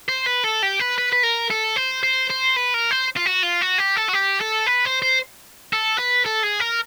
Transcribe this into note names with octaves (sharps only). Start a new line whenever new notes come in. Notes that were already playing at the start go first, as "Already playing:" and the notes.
C5
B4
A4
G4
B4
B4
B4
A#4
A4
C5
C5
C5
B4
A#4
C5
F4
F#4
F4
F#4
G4
A4
F#4
G4
A4
B4
C5
C5
A4
B4
A4
G#4
A#4